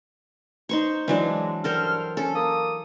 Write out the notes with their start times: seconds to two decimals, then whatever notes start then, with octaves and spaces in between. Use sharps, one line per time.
0.69 D#4 C5 C#6
1.08 E3 F#3 G#3 D4
1.64 G2 A4 A#4 C5 F6
2.17 C#4 A4
2.34 A#3 D#6